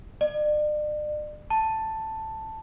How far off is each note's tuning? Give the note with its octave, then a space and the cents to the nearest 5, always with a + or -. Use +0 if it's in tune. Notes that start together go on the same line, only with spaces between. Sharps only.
D5 +40
A5 +5